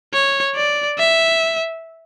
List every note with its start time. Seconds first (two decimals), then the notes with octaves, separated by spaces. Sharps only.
0.13 C#5
0.56 D5
0.99 E5